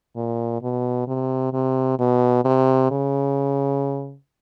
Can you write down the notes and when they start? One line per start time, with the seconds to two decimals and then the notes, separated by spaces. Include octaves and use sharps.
0.16 A#2
0.62 B2
1.07 C3
1.53 C3
1.99 B2
2.45 C3
2.91 C#3